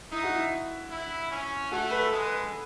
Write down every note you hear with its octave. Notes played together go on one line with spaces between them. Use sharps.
D#4 E4
F#4
E4
E4
C#4
A3 F#4
B4
A4
G#3
B4